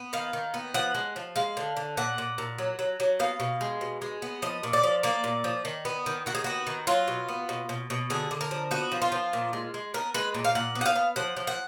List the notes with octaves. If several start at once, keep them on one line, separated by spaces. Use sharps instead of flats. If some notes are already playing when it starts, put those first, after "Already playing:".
Already playing: B3
D#3 F5
D#3
B3
F3 F#5
G#3
F3
G#3 F5
D3
D3
A#2 F#5
A#2
A#2
F#3
F#3
F#3
B3 F5
B2
G#3
B2
G#3
B3
F3 D#5
A#2
D5
F3
A#3 D5
A#2
F3
D#3
B3
D#3
D#3 F#4
G#4
B3 F#4
D#3
F#3 F4
B2
B3
B2
B2
B2
D3 G#4
D3
A#4
F3
B3 F#4
F3
F4
F3
A#2
G#3
G#3
B3 A#4
G#3 B4
A#2
F5
A#2 F#5
B3
F#5
F5
B3
F3 F#5
F3
F#5